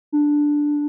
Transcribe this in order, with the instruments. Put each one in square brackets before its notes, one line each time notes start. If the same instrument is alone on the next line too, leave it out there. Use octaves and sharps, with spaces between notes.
[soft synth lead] D4